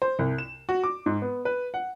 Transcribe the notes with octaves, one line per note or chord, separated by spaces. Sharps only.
C5
C2
E7
F#4
D6
G#2
B3
B4
F#5